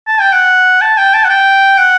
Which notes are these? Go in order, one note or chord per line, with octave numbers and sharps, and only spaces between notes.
A5
G5
F#5
A5
G5
A5
F#5
G5
F#5